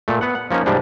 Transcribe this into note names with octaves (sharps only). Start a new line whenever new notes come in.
A#2 A3
B3 F#5
F#5
F3 A#3 C#4 D#4
G#2 C3 E3 F3 G3 D4